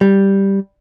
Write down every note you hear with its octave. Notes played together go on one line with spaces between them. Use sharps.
G3